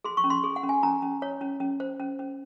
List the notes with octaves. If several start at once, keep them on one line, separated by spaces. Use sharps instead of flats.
G#4 C6
C#6
C#4
C6
G#4
F#5
C#4
G#5
C#4 A#5
C#4
C#5
C#4
C#4
C5
C#4
C#4